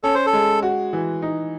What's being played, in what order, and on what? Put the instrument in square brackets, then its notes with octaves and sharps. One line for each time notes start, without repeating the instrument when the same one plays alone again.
[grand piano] C#4 [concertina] A4
[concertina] C5
A4
[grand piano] G#3
F#4
E3
D#4